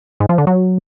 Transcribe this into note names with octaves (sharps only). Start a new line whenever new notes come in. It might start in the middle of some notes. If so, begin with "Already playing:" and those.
G#2
F3
D3
F#3